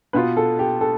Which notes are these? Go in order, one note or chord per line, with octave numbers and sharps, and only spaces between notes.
B2 B3 F4 B4
A4
G4
A4